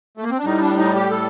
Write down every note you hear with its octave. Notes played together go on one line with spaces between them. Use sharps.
A3
A#3
C4
D4
A2 G3 D#4
D4
D#4
G4
A4